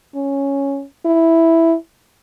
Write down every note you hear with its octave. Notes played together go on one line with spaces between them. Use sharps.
C#4
E4